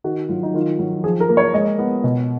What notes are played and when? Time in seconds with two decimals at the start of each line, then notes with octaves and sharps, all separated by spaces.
0.04 D#3 F#4
0.29 F#3 F4
0.43 D#4
0.54 D#3 F4
0.79 F#3
1.04 F3 G#4
1.20 A#4
1.29 A#3
1.37 C#5
1.53 G#3 D#5
1.79 B3
2.04 B2